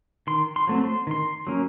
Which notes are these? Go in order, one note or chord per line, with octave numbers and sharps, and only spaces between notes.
D#3 C6
C6
F#3 A3 C4
C6
D#3 C6
F#3 A#3 C#4